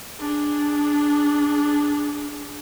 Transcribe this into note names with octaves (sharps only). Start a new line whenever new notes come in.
D4 G#4